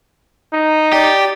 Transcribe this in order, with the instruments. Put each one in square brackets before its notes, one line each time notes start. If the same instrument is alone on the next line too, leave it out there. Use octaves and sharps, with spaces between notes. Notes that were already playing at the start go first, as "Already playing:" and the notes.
[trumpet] D#4
[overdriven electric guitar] G4 [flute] D5